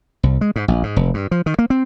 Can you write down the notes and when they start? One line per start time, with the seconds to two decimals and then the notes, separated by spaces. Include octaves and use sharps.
0.23 C2
0.41 G#3
0.56 G#2
0.68 A#1
0.83 G#2
0.96 F1
1.14 G2
1.31 F3
1.46 D#3
1.59 A#3
1.70 C4